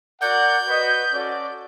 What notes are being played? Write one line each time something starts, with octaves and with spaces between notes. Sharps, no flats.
F#4 A#4 D5 F#5 G6
F#4 B4 D#5
C#4 F#4 A4 D5